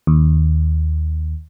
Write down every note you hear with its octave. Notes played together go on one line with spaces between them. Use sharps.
D#2